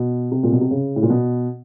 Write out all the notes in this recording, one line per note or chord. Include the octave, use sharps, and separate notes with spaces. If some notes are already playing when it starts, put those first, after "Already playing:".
Already playing: B2
C3
A#2
B2
C3
C#3
A2
A#2
B2